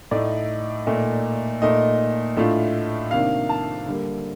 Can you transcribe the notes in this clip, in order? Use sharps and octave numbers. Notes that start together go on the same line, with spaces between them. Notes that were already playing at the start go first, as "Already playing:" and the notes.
A2 A3 D#4 D5
A#2 A3 D#4
A#2 A3 D#4 D#5
A2 A3 D4 F4
C3 D#3 A#3 D4 F5
A5
D3 G3 A#3